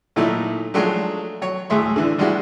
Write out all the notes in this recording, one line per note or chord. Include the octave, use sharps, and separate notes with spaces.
A#2 F#3 A3 D#4 E4
F3 F#3 G#3 A3 D4
F#3 C#5
D2 A2 G#4 E5 C6
D3 E3 D4
G3 G#3 D4 E4 F#4